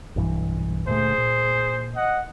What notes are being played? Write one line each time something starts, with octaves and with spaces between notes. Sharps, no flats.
B1 G2 E3
D2 A#2 A3 G#4 C5
A#2
D#5 F#5